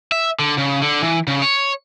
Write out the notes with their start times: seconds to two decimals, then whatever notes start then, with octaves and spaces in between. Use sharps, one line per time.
0.12 E5
0.39 D3
0.58 C#3
0.82 D3
1.02 E3
1.28 C#3
1.42 C#5